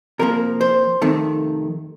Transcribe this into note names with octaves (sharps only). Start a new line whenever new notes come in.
C3 F3 A#3 A#4
C5
F2 C3 D#3 A3